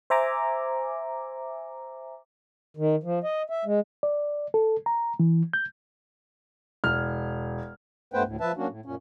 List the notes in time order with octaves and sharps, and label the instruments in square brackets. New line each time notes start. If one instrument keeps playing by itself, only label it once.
[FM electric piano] C5 E5 G#5 A#5 D6
[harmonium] D#3
F3
D#5
E5
G#3
[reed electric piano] D5
A4
A#5
E3
G6
[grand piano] E1 F6
[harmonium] G2 A3 B3 B4 C5 G5
D2 A2
F3 B4 E5 A5
F#3 A#3 C#4 D4 F#4
A2
F#2 A#2 C#4